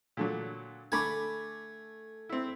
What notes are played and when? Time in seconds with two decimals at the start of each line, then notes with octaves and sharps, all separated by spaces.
0.17 A#2 D3 F#3
0.92 D3 A3 G#5 B5 D6
2.29 C4 E4